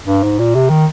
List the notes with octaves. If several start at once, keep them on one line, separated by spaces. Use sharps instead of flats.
G2
G#2
A#2
C3
D#3